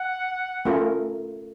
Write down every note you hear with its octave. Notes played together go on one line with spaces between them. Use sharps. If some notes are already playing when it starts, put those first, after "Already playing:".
Already playing: F#5
A3 C#4 F4 A#4